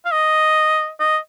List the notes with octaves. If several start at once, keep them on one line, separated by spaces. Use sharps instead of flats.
F5
D#5
D#5